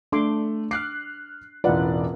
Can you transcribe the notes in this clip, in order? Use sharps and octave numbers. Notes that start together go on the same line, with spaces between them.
A3 D4 C6 D6
D6 F6 F#6 C7
E1 A1 F4 B4 D5 F#5